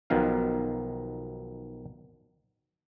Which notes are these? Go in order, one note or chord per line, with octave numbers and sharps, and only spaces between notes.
B1 B2 D#3 F3 F5